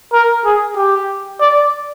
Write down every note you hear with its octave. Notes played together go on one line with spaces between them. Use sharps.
A#4
G#4
G4
D5